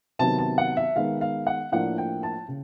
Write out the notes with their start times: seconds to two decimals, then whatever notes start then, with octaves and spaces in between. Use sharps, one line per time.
0.19 C3 D#3 F#3 B3 A5
0.39 A5
0.58 F#5
0.77 E5
0.96 D#3 G#3 B3 F5
1.21 F5
1.47 F#5
1.72 A2 F3 A#3 D4 F#5
1.98 G5
2.23 A5
2.48 C#3